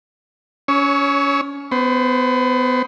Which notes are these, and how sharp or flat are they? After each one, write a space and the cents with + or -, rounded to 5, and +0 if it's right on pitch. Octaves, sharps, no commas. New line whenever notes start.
C#4 +25 C#5 +0 E6 -30
B3 +25 C5 +0